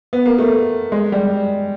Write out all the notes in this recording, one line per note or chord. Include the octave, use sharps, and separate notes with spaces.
B3
A#3
A3
G#3
G3